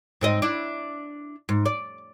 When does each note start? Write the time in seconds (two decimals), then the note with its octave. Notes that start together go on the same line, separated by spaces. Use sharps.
0.21 G#2 C4 D#5
0.42 D4 E4
1.49 G#2
1.65 D5